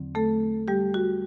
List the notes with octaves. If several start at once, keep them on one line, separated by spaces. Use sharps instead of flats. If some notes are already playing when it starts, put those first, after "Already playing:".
Already playing: E2 D3 F#3 C4
A3 A4
G3 G4
F#4